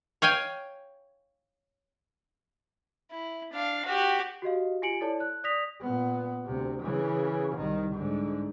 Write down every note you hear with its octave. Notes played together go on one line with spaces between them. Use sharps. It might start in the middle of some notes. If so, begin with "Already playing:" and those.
C#5 F5 G5 G#5
E4
D4 F5
F#4 G4
F#4 G4 D#5 F5
F4 G4 G#5 C#7 D7 F#7
E4 A4 C#5 D5 A5
F#6
D5 D#6 A#6 B6 F7
A#2 B3
D2 C3
C#3 E3
C2 D#3
G#2 D3